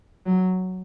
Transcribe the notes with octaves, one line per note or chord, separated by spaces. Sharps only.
F#3